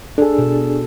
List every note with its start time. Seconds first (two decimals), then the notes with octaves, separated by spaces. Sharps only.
0.18 D4 G#4 A4
0.38 B2